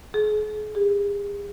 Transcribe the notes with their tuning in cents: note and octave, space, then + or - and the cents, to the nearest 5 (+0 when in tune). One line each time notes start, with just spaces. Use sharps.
G#4 +40
G#4 -45